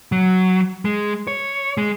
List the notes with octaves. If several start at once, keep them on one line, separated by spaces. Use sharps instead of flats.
F#3
G#3
C#5
G#3